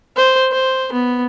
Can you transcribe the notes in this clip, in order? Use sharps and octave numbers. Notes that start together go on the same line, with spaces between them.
C5
C5
B3